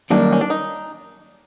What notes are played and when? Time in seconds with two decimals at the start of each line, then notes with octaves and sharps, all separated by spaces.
0.10 F#2 D#3 G3 A#3 D4
0.32 C#4
0.41 D4
0.50 D#4